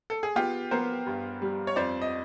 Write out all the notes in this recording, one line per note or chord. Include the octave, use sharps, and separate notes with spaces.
A4
G#4
B3 F4 G4
B3 A#4 C5
G2
G3
C#5
F2 C5 D5
D#5